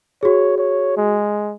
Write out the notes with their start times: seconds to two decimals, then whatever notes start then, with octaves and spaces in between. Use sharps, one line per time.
0.23 F#4 G#4 C#5
0.58 C#5
0.97 G#3